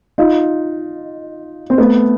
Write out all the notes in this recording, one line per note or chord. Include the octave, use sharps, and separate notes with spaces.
D#4 F4
C4
A3 B3